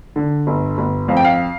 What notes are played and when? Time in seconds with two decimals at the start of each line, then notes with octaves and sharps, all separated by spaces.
0.16 D3
0.47 G1
0.78 G1
1.08 F2 F5
1.17 G5
1.25 F5